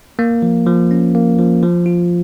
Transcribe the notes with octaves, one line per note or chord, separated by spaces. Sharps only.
A#3
F3
F3
C#4
A#3
F3
F3
F4